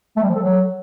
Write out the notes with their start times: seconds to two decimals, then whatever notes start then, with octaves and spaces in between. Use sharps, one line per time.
0.17 A3
0.23 G3
0.29 F3
0.36 A4
0.42 F#3